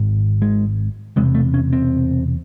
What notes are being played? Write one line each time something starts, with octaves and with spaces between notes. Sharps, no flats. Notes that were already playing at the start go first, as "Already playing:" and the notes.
Already playing: G#1 G#2
G#3
E1 E2 C3 G#3
A3
C#4
C4